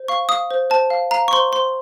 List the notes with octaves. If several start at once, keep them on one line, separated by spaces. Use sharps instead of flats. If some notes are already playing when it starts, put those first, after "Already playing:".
Already playing: C5
F5 C#6
F5 D#6
C5
C5 A5
F5
F5 A#5
C#6
C5 C6
C5 C6